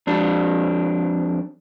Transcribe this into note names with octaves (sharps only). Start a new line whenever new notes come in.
F2 D4